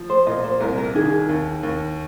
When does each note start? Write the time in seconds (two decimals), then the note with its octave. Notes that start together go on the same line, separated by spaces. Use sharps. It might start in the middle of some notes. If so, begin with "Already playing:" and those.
Already playing: F3
0.10 C5
0.27 A#2 D#5
0.44 C5
0.60 C2 A#4
0.78 A#4
0.95 D#3 G#4
1.29 D#2
1.63 D#2